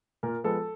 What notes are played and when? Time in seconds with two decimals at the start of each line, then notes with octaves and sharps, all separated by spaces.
0.23 A#2 A#4
0.44 F3 G#3 B3 A4